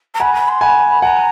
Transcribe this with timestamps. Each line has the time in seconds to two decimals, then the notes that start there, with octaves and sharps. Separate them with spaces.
0.14 A#5
0.20 F#5 G#5 B5
0.34 B5
0.48 C6
0.61 F#5 G#5 B5
1.02 F#5 G#5 A#5